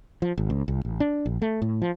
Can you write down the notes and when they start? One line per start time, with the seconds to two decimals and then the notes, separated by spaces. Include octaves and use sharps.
0.22 F3
0.38 G#1
0.50 C#2
0.68 C2
0.85 A1
1.00 D4
1.26 A#1
1.42 A3
1.62 A2
1.82 F3